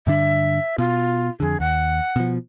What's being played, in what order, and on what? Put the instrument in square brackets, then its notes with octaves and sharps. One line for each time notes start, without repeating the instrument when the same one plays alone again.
[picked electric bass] G2 D3 D4 [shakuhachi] E5
[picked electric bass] B2 [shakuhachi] F4
[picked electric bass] F2 D3 [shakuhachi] G#4
[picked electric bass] D#2 [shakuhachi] F#5
[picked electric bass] B2 F3